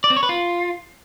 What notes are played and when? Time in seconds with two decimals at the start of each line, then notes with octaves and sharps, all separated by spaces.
0.04 D5
0.10 C4
0.17 C#5
0.23 B4
0.29 F4